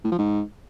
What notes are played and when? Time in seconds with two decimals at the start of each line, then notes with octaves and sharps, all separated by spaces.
0.04 A2
0.11 F3
0.18 G#2